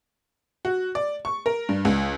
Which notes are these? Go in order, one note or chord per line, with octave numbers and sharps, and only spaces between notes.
F#4
D5
C#6
A#4
G2
C#2